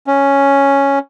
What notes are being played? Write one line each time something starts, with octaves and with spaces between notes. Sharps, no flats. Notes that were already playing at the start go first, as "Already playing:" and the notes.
C#4